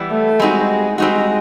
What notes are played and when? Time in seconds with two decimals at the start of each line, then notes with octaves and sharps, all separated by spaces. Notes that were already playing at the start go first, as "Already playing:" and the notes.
Already playing: E3 G3 B3 E4
0.11 A3
0.40 G3 G#3 C4 D#4 F#4
0.98 G3 G#3 C4 D#4 F#4